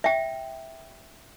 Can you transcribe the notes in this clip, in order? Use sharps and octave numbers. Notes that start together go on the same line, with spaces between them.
E5 G5